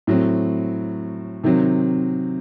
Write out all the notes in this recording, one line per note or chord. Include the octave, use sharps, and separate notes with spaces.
A2 F#3 C4
C3 D#3 F#3 C4